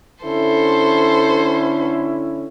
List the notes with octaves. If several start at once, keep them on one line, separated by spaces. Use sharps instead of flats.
D3 C#4 E4 A4 C5